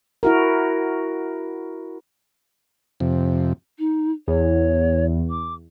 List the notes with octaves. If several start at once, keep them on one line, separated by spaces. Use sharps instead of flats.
E4 F#4 A#4
F2 C3
D#4
E2 C#5
D6